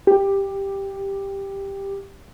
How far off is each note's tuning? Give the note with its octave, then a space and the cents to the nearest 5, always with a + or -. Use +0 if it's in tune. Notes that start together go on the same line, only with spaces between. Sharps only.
G4 +5